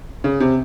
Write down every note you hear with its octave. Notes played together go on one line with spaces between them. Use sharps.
C#3
C3